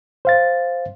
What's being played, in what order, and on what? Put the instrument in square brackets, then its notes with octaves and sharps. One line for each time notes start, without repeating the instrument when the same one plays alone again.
[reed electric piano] C5 F5 A6